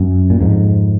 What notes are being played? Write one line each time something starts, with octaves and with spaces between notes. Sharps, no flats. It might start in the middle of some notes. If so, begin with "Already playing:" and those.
Already playing: F#2
A#2
F2 G#2